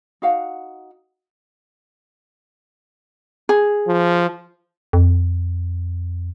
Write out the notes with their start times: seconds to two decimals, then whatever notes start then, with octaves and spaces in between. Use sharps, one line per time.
0.22 D#4 F#4 F5 F#5
3.49 G#4
3.88 F3
4.93 F2